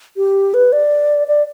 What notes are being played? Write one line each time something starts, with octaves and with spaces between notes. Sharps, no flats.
G4
B4
D5
D5